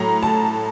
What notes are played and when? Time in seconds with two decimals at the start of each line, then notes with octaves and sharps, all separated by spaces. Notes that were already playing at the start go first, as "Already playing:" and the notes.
Already playing: A2 F#3 A#5
0.23 A5